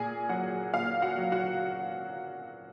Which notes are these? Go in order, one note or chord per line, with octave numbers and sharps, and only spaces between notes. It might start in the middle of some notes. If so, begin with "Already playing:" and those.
Already playing: A#2 G#4 G#5
F#3 F#4 F#5
A#2 F5
F#4 F#5
F#3
F#4 F#5